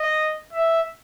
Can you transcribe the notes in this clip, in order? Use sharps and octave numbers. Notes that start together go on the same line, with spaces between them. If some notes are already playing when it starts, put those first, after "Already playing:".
Already playing: D#5
E5